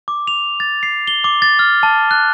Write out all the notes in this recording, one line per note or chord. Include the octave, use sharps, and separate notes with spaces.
D6
F7
A6
C7
G7
D6
A6
F6
A5
F#6